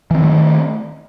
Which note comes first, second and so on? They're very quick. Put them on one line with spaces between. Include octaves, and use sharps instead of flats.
E3 C4 D#3 A3